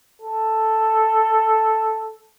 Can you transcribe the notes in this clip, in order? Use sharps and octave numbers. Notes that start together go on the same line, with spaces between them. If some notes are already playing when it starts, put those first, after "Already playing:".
A4